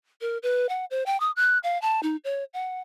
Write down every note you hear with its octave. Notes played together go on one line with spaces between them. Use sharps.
A#4
B4
F#5
C5
G5
D#6
F#6
F5
A5
D#4
C#5
F#5